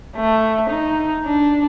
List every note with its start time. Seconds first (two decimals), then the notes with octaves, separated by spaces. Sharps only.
0.16 A3
0.69 D#4
1.24 D4